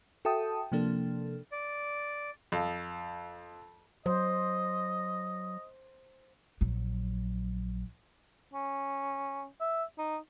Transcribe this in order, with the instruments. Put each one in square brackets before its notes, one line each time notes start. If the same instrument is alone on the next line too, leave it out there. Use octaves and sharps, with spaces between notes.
[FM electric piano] F#4 A4 E5 G5 A5 D#6
C3 F3 A#3 D4 A4
[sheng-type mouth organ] D5
[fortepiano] F2
[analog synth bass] F#3 [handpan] C5 [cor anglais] D#5
[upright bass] A#1 F#3
[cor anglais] C#4
E5
D#4